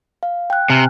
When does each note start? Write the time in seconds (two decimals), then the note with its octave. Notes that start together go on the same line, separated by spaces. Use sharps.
0.23 F5
0.50 G5 F#6
0.70 C3 G#5 F6